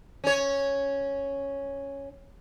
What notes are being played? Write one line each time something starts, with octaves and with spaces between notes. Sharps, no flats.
C#4 C#5